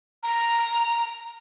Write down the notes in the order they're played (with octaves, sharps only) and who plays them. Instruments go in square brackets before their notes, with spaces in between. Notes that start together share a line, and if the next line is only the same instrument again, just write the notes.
[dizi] A#5